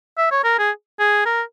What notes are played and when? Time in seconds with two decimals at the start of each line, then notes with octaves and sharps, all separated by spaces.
0.17 E5
0.31 C#5
0.44 A#4
0.58 G#4
0.99 G#4
1.26 A#4